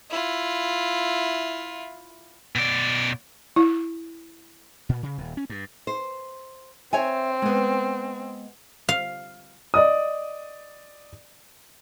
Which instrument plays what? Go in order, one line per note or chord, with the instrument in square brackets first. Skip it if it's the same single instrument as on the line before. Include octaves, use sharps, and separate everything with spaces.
[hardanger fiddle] E4 F4
[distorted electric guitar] B2 D5
[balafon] E4
[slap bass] A#2
C#3
D#1
C#4
G2
[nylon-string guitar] C5
[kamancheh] C4 [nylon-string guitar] C#5 E5 G#5
[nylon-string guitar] G#3 B3
[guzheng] F5
[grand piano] D5 D#5 D#6